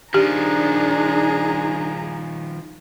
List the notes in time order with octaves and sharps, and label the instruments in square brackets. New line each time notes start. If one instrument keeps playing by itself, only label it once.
[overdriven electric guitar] D#3 F3 [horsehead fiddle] D4 D#4 [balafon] G4 [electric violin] G#4 A#5